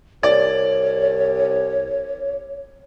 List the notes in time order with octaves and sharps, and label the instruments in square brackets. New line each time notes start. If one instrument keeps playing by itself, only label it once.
[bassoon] C2 [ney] C#5 [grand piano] D5